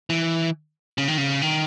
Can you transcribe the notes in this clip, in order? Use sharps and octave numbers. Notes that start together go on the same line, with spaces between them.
E3
C#3
D#3
C#3
D#3